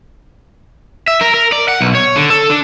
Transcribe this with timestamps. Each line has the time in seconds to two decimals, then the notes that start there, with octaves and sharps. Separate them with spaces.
1.08 E5
1.21 A#4
1.34 A#4
1.52 D5
1.68 F#5
1.81 B1
1.95 C#5
2.16 D3
2.30 A4
2.50 D4